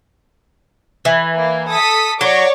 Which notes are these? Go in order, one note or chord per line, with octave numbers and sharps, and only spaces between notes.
E3
A#3
A4 D#6 B6
F#3 C#5 D5 D6